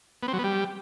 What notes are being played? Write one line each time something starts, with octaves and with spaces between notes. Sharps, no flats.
B3
C4
F#3
B3
G3